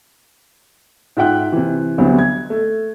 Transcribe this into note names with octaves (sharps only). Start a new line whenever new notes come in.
G#2 F4 E5 F#5 G5 F#6
C3 E3
D2 F#3 G3 B3 C4
G#6
A3